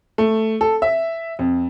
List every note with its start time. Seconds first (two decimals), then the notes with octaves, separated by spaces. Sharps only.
0.18 A3
0.61 A4
0.82 E5
1.39 F2